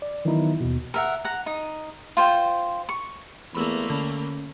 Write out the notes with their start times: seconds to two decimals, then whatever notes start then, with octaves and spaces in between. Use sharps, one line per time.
0.02 D5
0.25 D#3 E3 F#3 B3 D#4 E4
0.61 D#2 B2
0.94 A#4 E5 F#5
1.25 F#5 A#5
1.46 D#4
2.17 F4 C5 G5
2.89 C#6
3.55 E2 A3 A#3 B5 C6 E6
3.90 D3 C#4 B5